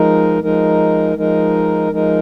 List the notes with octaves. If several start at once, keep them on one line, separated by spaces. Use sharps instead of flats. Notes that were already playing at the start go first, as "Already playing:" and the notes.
Already playing: F3 G#3 D#4 A#4
F3 G#3 D#4 A#4
F3 G#3 D#4 A#4
F3 G#3 D#4 A#4